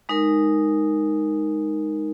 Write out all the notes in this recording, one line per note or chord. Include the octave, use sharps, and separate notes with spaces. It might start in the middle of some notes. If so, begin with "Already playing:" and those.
G#3 D#4 A#4